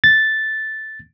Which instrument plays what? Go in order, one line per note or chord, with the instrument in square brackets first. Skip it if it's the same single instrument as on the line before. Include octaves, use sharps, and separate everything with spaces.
[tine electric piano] A6